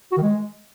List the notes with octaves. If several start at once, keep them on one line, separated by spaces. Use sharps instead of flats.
F#4
D#3
G#3